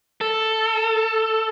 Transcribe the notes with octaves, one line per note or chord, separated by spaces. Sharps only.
A4